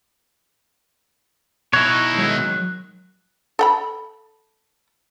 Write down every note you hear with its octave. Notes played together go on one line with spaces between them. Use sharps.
B2 D#4 E4 C#5 F#6
D#3 F#3 G#3
A4 G5 B5